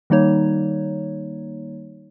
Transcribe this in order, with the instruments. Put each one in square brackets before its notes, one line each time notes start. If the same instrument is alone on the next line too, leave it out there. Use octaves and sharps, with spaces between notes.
[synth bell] D#3 G3 A#3 D#4 C#5